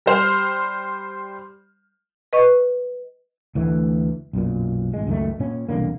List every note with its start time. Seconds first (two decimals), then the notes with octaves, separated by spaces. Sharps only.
0.06 G3 C5 F6
2.33 B4 D#5 C#6
3.55 D2 E3 A3
4.33 B1 F#2 A#2
4.94 G#1 G#3
5.07 C#2 F#2 D#3 A3
5.39 A#2 C#4
5.69 E1 C2 D3 A#3